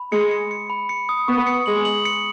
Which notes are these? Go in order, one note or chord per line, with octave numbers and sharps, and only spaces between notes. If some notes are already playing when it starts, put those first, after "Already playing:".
Already playing: B5
G#3 C#7
C#7
C#7
B5
C#7
D#6
B3 C#6
C#7
G#3 F#7
F#7
C#7